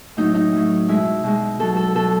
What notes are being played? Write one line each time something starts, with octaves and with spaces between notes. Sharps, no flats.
A2 F#3 D#4
D#4
A2 F#3
B2 G#3 E4
B2 G#3
B2 F#3 A4
A4
B2 F#3 A4